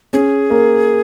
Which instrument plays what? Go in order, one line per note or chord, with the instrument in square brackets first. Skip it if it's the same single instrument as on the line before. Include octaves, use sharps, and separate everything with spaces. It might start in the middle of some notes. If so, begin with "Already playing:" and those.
[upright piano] C#4 [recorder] G#4
[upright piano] A#3